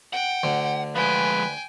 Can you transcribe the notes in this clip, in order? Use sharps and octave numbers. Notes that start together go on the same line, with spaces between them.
F#5 G5
D2 D3
F3 G#3 B4 G5 G#5